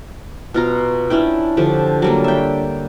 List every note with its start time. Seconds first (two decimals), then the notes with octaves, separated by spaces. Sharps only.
0.54 B2 F4 A#5
1.10 C#4 D4 E4 G5
1.57 D3 F3 G4
2.02 F#3 G3 A#3
2.24 E5 G5